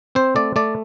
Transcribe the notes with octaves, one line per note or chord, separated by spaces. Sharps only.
C4 C5
A3 D5
A3 D5